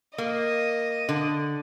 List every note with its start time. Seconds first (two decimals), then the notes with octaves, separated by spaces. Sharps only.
0.18 A#3 D#5
1.09 D3